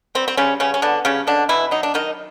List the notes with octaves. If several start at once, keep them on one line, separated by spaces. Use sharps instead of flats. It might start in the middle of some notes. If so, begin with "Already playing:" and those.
G3 C4
C4
C#3 G3 C#4
C#3 B3 C#4
C#4
D3 B3 D4
C#3 G3 C#4
B2 D3 D4
B2 E3 E4
F#3 D#4
D4
D#3 F#3 D#4